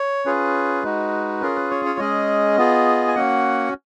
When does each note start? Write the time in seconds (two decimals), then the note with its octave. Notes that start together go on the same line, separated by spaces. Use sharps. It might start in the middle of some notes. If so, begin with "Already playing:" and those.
Already playing: C#5
0.26 C#4 F4 G#4 B4
0.83 G#3 D#4 F#4
1.42 C#4 F4 G#4 A#4
1.56 B4
1.71 C#5
1.85 C#5
1.99 G#3 C#4 G#4 D#5
2.57 B3 F4 G#4
3.08 G#5
3.16 A#3 C#4 F#4 F#5